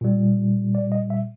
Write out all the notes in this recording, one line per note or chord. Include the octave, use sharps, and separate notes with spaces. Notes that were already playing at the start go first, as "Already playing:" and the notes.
A#2 G3
D5
D#5
E5